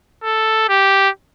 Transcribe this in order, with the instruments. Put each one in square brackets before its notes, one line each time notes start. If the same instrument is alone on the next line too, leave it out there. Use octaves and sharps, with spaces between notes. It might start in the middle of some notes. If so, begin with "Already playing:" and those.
[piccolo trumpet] A4
G4